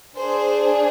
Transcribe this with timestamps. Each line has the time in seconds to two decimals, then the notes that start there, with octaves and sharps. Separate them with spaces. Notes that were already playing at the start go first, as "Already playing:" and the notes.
0.16 D4 G#4 C5